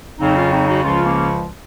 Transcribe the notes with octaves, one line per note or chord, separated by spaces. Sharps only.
F2 C#3 F#3 C4 D#4
C#4 F4
C4 D#4
D#4 F#4
C#2 C#3 F3 C#4 F4
A#3 C#4